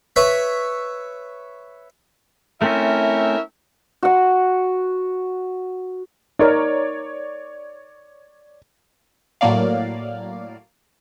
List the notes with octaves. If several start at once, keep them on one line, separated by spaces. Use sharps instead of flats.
B4 C#5 E5
A3 C4 C#4 E4 A#4 E5
F#4 F#5
D#4 A#4 C#5 D5
A2 F#3 A#3 D5 F5